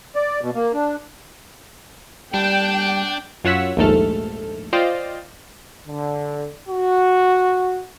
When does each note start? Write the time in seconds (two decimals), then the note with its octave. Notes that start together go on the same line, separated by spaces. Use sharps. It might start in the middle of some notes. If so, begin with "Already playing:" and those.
0.16 D5
0.41 B2
0.55 A#3
0.73 D4
2.34 G3 D4 G5
3.44 F#2 F4 C#5 F#5 E6 B6
3.77 A#1 D#2 G#2 A3 A4 F6
4.73 F4 C5 D5 D#5 F5 G5
5.87 D3
6.69 F#4